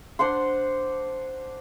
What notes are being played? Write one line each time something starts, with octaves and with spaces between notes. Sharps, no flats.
D4 C5 F#5 C6